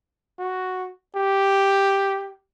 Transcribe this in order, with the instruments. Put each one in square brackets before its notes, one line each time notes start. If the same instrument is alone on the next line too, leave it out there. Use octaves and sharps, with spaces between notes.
[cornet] F#4
G4